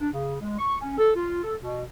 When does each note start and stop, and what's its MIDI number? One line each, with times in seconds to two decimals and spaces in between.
0.01 0.08 62
0.13 0.36 49
0.41 0.55 56
0.58 0.75 85
0.81 0.93 61
0.97 1.10 69
1.15 1.40 65
1.43 1.55 69
1.61 1.82 47